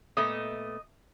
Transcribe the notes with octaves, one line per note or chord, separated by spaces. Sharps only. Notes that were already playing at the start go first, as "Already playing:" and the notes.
A#2 A3 B3 D#5